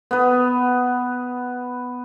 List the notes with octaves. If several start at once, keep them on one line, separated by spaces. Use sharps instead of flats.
B3 B4